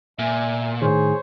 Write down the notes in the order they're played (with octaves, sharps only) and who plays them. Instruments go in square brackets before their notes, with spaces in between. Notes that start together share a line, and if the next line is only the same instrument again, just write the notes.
[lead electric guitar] A#2 [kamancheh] E5 G#5
[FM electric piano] A2 D#3 [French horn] G#4 [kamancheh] C5 C#5